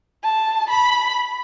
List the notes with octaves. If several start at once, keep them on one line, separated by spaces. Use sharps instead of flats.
A5
B5